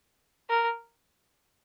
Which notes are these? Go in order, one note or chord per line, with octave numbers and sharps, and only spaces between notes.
A#4